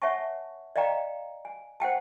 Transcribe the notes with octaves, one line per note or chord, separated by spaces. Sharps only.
C#5 E5 F#5 G#5 A5 C#6
D5 D#5 F5 G5 A#5
G#5
C5 F#5 G5 A5